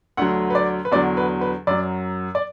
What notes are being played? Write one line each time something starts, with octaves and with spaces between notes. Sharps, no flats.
D2 D3 F#3 F#5
B4
D5
B4
E2 D3 F#3 D5
B4
B4
F#2 F#3 D5
D5